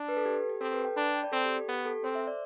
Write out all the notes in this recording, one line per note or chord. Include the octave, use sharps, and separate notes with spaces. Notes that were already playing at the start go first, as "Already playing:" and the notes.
Already playing: D4
B4
A4
G4
G4
C4 A4
B4
G5
D4 B5
A5
G5
D5
C4 A4
G4
G4
B3 G4
A4
C4 C5
E5
D5